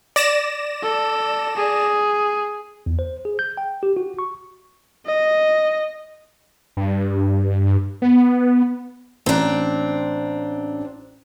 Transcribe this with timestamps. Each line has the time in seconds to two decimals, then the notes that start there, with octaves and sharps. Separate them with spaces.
0.16 D5 A#6 E7
0.82 A4
1.57 G#4
2.86 E2
2.99 C5
3.25 G#4
3.39 G6
3.57 G5
3.83 G4
3.97 F#4
4.19 C#6
5.06 D#5
6.77 G2
8.02 B3
9.26 A1 C4 D4 A#5 F#6